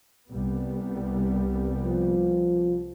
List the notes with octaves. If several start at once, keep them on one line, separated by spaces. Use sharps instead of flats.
C2 G3 B3
F3